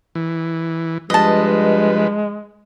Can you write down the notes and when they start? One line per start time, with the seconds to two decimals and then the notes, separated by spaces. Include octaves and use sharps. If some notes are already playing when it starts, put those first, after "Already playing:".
0.15 E3
1.10 G2 F3 G#3 B4 D#5 A5